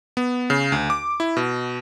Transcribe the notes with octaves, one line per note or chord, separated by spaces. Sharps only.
B3
C#3
D2
D6
E4
B2